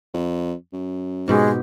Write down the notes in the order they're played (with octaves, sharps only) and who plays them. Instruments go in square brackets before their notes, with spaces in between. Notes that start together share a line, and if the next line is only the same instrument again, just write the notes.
[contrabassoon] F2
F#2
[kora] G#2 B2 G4 [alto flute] G#3